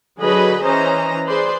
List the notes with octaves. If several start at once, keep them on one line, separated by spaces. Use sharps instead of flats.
D3 F#3 G#4 B4 D#5 B5
E3 C#4 C5 D#5 A#5
G#4 B4 C5 D5 C6